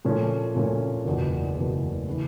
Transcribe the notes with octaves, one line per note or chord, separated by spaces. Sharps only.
A#2 F3 A3 C#4
A#2 F3 A3 C#4
F#1 E2 B2
F#1 E2 B2
C#3 E3